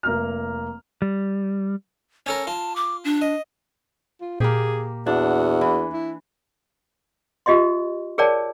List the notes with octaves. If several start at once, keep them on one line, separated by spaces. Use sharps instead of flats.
F1 A#3 A#5 F6
G3
C#4 A4 A#4 C#5
F4 A5
D6
D4
D#5
F4
A#2 A#3 G4 G#4
E2 D4 F#4
E3
E4
F4 G4 D#5 E5 C6
G#4 A#4 C#5 D5 G5 A5